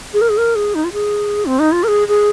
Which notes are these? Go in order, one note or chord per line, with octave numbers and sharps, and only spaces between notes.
G#4
A#4
G#4
A#4
G#4
D#4
F4
G#4
C4
D#4
F4
A#4
G#4
G#4